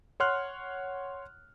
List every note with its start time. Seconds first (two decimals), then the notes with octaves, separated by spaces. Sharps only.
0.20 C#5 F#5 C6 F6 F#6